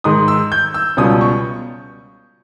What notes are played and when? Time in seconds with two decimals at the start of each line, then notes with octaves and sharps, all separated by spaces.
0.04 G#2 D#3 G#3 D#4 D#6
0.28 E6
0.52 G6
0.74 E6
0.97 C#2 B2 G3 C#4 D#6
1.21 C#6